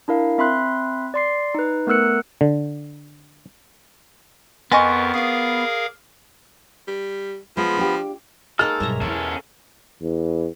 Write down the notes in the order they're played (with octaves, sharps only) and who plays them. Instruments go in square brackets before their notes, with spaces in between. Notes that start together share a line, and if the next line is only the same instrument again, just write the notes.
[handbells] D4 E4 A#4 F5
C4 E5 B5 C6 F#6
D5 C6 C7
D#4 B4
A3 B3 A#4 E6 F#6 C#7
[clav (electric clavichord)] D3
[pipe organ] F2 A#4 [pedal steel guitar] B3 C#6 [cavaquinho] D#5 G#5 C6
[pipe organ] G#4 A#4 F5 [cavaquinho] D5 D#6
[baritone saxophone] G3
[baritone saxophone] F3 [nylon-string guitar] G#3 [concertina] B3 B5
[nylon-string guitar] D4 F4 G4
[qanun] G#3 A#3 D#4 [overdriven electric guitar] A4 [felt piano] F6
[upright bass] B1 G2 [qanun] C#5 E5 A#5
[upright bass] E2 E4 [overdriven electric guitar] C#4 A4
[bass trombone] E2